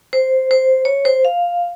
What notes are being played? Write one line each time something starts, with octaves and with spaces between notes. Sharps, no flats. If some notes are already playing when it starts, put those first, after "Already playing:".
C5
C5
C#5
C5
F5